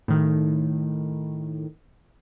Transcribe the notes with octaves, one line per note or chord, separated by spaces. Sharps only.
A2 D#3